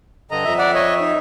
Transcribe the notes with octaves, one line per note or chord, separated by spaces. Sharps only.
G2 D3 D#5 A#5
F2 E5
D5 F#5
C#5 D#5
D#4